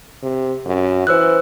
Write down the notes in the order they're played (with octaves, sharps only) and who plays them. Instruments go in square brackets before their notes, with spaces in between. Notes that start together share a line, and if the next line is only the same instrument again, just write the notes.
[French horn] C3
F#2
[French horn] E3 [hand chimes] C5 E6 F#6